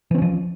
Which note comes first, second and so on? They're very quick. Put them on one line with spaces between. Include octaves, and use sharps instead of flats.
E3 C4 C#4 F3